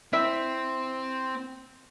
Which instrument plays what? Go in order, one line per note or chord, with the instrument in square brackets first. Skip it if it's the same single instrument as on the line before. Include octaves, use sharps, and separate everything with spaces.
[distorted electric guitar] C4 [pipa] E4 E5